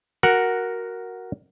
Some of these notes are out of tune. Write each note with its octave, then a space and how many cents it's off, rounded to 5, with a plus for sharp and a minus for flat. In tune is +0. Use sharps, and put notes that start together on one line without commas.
F#4 +0 A#4 +0 F#5 +0